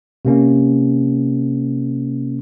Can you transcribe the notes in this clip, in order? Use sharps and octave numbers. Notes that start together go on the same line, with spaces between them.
C3 A#3 C#4